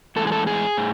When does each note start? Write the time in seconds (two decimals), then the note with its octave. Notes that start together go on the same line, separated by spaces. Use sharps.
0.16 A2 E3 G#3 A4
0.27 G#4
0.32 A4
0.47 G#4
0.77 A2